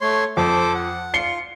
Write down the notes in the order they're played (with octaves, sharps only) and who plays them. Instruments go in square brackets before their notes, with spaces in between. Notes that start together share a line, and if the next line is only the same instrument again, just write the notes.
[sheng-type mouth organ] A3 C#5 C6
[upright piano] F2 [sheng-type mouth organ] A4 C5 D6
[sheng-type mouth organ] F#5
[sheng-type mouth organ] F4 [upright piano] C7 C#7 G7